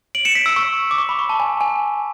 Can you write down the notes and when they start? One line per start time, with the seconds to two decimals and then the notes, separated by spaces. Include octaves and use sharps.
0.15 D7 F#7
0.25 C#7 E7
0.35 B6 D7
0.46 E6
0.56 C#6
0.91 D6
0.98 C#6
1.09 B5
1.19 C#6
1.29 A5
1.40 G#5
1.61 G#5